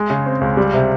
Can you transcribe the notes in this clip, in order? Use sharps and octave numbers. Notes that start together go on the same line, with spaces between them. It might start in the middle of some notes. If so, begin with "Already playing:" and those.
Already playing: G#3
C#3
C4
C#2
G3
C3